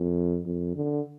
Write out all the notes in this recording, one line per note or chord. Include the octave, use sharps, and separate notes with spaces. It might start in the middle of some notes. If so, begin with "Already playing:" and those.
Already playing: F2
F2
D3